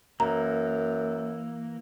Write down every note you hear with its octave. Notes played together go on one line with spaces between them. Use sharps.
F#2 E3 A#3 A#5